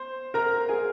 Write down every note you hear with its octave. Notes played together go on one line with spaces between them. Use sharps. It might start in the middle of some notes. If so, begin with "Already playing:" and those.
Already playing: C5 C6
A#4 A#5
G#4 G#5